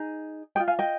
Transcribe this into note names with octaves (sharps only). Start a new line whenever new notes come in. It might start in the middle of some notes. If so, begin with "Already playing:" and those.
Already playing: D#4 G#4
G#4 D#5 G5
F4
F5 G#5
D#5 G5